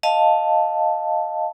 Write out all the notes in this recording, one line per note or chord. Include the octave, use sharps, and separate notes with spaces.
D#5 F5 A5